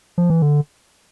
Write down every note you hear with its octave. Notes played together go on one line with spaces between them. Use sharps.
F3
E3
D3